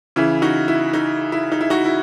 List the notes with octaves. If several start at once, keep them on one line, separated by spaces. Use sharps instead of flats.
C#3 E3 E4
D#4 F#4
E4
D#4
E4
D#4
E4
D#4 F#4
E4